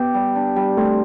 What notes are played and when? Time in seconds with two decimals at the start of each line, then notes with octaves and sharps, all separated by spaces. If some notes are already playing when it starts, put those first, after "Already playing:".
Already playing: B3 G4
0.14 G3
0.35 D4
0.56 G3
0.77 A3 C4